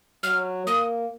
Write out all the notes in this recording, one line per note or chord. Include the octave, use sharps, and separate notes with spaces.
F#3 F6
A#3 D#6